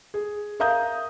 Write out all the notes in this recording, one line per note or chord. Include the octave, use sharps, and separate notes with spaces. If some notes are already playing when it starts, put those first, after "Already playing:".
G#4
A#4 E5 F5 A#5 D#6 G6